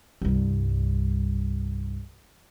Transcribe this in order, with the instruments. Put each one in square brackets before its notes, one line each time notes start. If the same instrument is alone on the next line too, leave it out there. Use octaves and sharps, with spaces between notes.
[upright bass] C2 G2